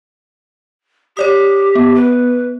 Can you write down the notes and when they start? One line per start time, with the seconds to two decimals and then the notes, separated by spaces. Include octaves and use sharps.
1.17 G4 C#5 D5 D#6
1.75 B3
1.95 B4